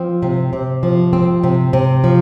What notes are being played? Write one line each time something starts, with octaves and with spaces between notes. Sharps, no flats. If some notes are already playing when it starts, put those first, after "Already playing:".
Already playing: F3 C4
C3
C3
F3
C4
C3
C3
F3